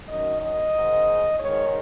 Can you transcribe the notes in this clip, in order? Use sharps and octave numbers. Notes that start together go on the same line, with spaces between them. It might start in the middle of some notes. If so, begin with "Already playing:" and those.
F#2 D#3 D#5
D#5
G#2 D#3
G#2 D#3 C#5